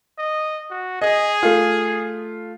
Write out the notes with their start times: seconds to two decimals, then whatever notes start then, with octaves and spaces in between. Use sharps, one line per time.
0.18 D#5
0.70 F#4
1.02 G#4 D#5
1.43 A3 F4